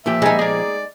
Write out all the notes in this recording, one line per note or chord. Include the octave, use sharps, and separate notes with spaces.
A#2 F3 G4 E5
G3 G#3 D#4 G#5
A#3 G#4 D5